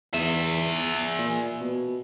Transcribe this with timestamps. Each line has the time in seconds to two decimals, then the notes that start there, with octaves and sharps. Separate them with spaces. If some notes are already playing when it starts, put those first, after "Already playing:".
0.14 E2 G#4 E5
1.19 A#2
1.61 B2